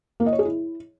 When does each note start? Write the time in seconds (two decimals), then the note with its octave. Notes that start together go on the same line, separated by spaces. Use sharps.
0.20 A#3
0.26 D#5
0.33 C#5
0.39 G#4
0.45 E4